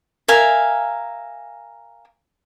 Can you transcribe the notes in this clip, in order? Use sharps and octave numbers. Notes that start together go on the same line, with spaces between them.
A#4 E5 F5 G#5